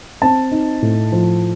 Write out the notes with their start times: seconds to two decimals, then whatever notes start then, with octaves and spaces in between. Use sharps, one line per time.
0.22 C4 A5
0.52 D#4
0.82 A2
1.12 F3